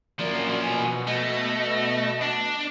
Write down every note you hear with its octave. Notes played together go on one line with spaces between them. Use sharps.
F#2 F3 A#3 D5
B2 G#5
A3 D#5
D4